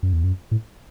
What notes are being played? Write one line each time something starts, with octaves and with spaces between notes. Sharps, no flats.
F#2
E2
F#2
A2